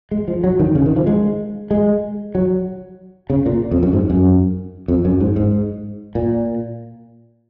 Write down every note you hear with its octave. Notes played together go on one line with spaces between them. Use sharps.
G#3
F3
F#3
D#3
C#3
D#3
F3
G#3
G#3
F#3
C#3
A#2
F2
F#2
G#2
F#2
F2
F#2
G#2
G#2
A#2